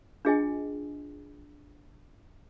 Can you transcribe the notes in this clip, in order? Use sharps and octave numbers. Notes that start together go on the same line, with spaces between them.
D4 F4 G#4 D#5 G5 G#5